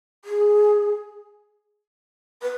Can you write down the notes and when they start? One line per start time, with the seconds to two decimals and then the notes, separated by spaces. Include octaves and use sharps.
0.25 G#4
2.42 B4